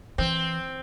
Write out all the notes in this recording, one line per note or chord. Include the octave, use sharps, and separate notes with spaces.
E3 C4